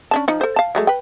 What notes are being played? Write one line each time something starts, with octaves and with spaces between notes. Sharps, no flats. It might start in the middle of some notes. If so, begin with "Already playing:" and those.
C#4 D4 A5
F3 D#4
A4 C5
F5 A5
F#3 G#3 A3
B4 G5